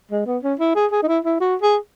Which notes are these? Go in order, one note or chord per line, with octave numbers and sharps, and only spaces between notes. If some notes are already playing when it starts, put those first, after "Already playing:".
G#3
B3
C#4
E4
G#4
G#4
D#4
E4
E4
F#4
G#4